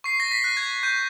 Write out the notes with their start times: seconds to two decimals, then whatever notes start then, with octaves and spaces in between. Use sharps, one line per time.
0.04 C#6 C7
0.20 A#6
0.32 B6
0.44 F#6
0.57 G#6
0.83 C#6 G6